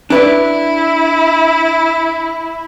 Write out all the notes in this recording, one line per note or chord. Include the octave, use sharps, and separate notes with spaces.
D4 E4 B4 D5